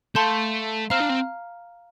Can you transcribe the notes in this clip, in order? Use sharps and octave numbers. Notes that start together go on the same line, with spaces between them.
A3 F5 A5 C6 G6
C4 F5 A#5 F6
D4
C4